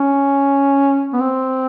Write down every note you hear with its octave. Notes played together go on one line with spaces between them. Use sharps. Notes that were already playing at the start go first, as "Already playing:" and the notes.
Already playing: C#4
B3
C4